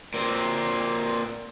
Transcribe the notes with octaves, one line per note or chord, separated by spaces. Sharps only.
A#2 C4